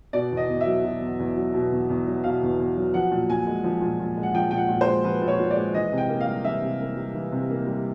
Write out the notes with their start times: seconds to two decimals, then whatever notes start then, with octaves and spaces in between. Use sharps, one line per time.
0.13 B2 D5
0.31 E2
0.37 D#5
0.48 E2
0.61 E5
0.66 F#3
0.84 B2
1.01 E2
1.19 E2
1.36 F#3
1.54 B2
1.71 E2
1.89 E2
2.07 F#3
2.24 B2 F5
2.42 E2
2.59 E2
2.77 F#3
2.94 F3 F#5
3.11 A#2
3.29 A#2 G#5
3.47 G#3
3.64 F3
3.81 A#2
3.99 A#2
4.17 G#3
4.23 F#5
4.34 F3 G5
4.51 A#2 G5
4.57 F#5
4.69 A#2
4.81 C5
4.86 G#3
5.04 F3 B4
5.22 A#2
5.28 C#5
5.39 A#2
5.51 D5
5.56 G#3
5.74 E3 D#5
5.92 C3
5.98 G5
6.09 A#3
6.20 F5
6.27 G3
6.44 E3 E5
6.62 C3
6.80 A#3
6.97 G3
7.15 E3
7.32 C3
7.50 A#3
7.67 G3